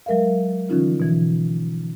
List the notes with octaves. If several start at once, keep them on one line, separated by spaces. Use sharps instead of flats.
F#3 G#3 A#4 E5 F5
D3 E3 F3 C#4 D#4 F4
B2 E3